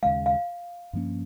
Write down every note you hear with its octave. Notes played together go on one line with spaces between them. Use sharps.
D#2 C#3 G#3 F5
F5
G2 F3 A#3 C#4